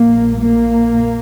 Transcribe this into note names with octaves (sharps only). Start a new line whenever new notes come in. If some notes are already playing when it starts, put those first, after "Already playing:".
Already playing: A#1 A#2 A#3
A#3